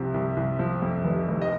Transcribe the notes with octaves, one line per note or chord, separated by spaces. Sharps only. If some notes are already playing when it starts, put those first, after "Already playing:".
Already playing: C2 C3 F3
C2
C2
F3
F2
F1
F1
D#5